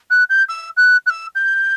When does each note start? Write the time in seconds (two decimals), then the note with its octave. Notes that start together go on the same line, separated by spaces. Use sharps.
0.10 F#6
0.29 G6
0.49 E6
0.77 F#6
1.06 F#6
1.10 E6
1.35 G6